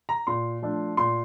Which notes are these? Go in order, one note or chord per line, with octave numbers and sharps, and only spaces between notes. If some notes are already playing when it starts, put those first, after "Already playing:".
A#5
A#2 C6
F3 A3 D4
A#2 C6